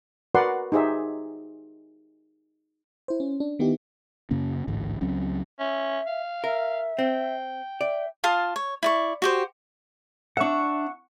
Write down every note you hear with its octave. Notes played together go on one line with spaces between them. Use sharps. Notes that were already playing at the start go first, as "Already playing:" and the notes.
F#4 A#4 B4 D5 F#5 C6
D#4 G4 G#4 C5 E5
E4 C5
C#4
D4
D#3 B3 D#4 E4 G4
F#2 C#3 A#3 C#4
A1 D2 G#2
C#2 F#3 C4 C#4
C#4 E5
F5
A#4 E5
C4 G5
D5 E5
F4 F5 A5 D#6
C#5
E4 D5 C#6
F#4 G4 C5
D4 E5 F#5 C#6